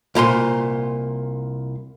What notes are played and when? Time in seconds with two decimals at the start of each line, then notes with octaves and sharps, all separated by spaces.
0.15 C2 A#2 A#5 C6